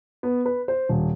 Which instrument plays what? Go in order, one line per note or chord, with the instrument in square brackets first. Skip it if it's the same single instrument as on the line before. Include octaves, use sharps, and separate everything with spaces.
[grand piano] B3
B4
C5
D#1